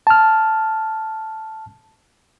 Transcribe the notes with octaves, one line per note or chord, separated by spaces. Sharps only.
A5 F6